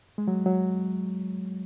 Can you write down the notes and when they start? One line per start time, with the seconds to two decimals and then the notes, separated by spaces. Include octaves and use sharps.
0.18 G#3
0.28 F#3
0.46 F#3